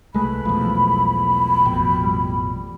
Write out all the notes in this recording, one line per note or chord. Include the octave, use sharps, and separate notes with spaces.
C2 G#3 A3 B4 B5
B1 E2 F3
A1 F2 B2 G5
G3